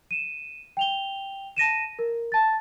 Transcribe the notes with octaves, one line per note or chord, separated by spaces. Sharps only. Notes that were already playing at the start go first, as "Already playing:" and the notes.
D#7 E7
G5 F7 G7
A5 A#6 D#7 E7
A#4
A5 A6